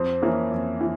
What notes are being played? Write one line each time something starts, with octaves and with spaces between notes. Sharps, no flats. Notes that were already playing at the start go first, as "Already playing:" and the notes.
Already playing: F2 C5
E3 A#3 C#4 E4
F2
E3